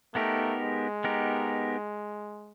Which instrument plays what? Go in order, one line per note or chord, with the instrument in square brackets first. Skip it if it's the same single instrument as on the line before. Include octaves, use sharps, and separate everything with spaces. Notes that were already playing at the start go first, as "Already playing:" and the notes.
[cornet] A3 [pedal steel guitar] B3 D#4 G4 A#4
[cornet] G#3
[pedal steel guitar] B3 D#4 G4 A#4